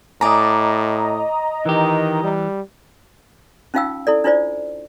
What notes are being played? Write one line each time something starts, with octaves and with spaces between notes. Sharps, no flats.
A2 D5 D#5 G#5 A#5
D#3 E3 G4
G3
C#4 D#4 F4 F5 G5 E6
E4 A4 D5
D4 E4 F4 C5 D5